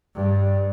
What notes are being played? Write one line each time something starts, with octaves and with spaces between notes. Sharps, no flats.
G2